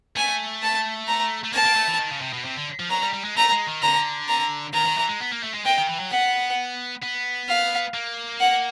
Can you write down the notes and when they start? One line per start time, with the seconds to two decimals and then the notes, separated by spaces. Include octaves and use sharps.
0.16 A3 G#5
0.62 A5
1.08 A#5
1.44 A3
1.53 A#3 A5
1.65 A#3
1.76 A3
1.88 E3
2.00 D#3
2.11 C#3
2.22 C3
2.33 B2
2.45 C3
2.57 D3
2.80 F3
2.90 F#3 A#5
3.03 G3
3.13 G3
3.25 G#3
3.37 A3 A#5
3.52 G#3
3.67 D#3
3.82 D3 A#5
4.28 A#5
4.73 D#3 A#5
4.86 D#3
4.98 E3
5.08 G#3
5.20 B3
5.31 A#3
5.43 A3
5.54 G#3
5.65 G#3 G5
5.77 D#3
5.89 E3
6.00 F#3
6.11 B3 F#5
7.02 B3
7.49 F5
7.94 A#3
8.40 F#5